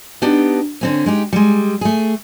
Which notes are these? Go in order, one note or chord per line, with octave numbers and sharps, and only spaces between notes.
B3 D4 D#4 G4
D3 C4 C#4
G#3 D#4 G4
G3 G#3
A3 G#4